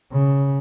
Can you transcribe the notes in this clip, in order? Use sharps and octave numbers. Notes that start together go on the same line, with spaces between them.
C#3